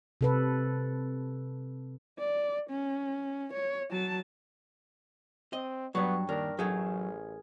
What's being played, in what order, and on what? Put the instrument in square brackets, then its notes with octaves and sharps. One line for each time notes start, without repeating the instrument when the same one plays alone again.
[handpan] C3 A4 B4
[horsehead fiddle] D5
C#4
C#5
F#3 A5
[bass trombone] C4 [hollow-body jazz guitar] D#5
[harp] G2 C#6 [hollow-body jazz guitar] F#3 [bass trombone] B3
[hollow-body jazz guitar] D#2 [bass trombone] D4 [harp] A#4
[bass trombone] A1 [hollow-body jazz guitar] F#3 A3 [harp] G#4